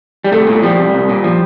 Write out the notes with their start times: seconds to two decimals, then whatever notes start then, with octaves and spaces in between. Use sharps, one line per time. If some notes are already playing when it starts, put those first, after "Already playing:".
0.24 G3
0.32 C2 A3
0.47 A#2
0.62 F3 G3
0.78 C2
0.94 C2
1.09 A#2
1.24 F3